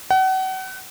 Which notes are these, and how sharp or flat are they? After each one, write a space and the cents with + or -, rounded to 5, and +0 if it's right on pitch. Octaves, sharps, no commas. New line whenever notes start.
F#5 +35